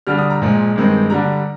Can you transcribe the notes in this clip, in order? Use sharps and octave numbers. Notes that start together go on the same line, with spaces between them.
D3 G3 D4 F6
D#6
A#5
A#2 F3 G#3
G2 D#3 G#3 C4
D3 G3 D4 A#5